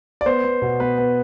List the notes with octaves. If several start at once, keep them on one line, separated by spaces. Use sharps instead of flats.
D5
B3 C5
B3
B2
B3 B4
B3